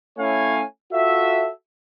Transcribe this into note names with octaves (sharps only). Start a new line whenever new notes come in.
A3 C#4 E4 C#5 F5 G#5
F4 F#4 A4 E5